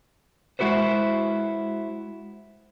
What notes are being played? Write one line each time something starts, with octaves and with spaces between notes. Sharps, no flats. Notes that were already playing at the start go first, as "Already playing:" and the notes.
G#3 E4 F#4 B4 C5